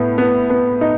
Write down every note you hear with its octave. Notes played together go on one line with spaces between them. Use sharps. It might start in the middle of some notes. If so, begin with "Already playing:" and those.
Already playing: A2 B3
B3
B3
D#4